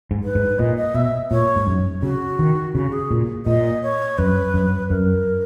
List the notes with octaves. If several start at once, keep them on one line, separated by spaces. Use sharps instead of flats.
G#2
B4
G#2
A#2 D#5
D#5
B2 E5
A#2 C#5
G#2
F#2
C#3 F#4
D#3
C#3 F#4
G#4
A#2
A#2 D#5
C#5
F#2 B4
F#2
F#2 A#4